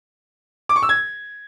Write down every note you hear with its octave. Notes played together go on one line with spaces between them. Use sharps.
D6
C#6
E6
G#6